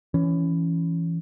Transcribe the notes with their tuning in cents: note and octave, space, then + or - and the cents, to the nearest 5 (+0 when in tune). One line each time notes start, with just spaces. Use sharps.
E3 +15 C#4 +10